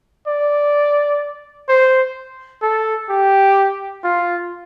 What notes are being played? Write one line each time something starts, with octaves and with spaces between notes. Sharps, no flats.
D5
C5
A4
G4
F4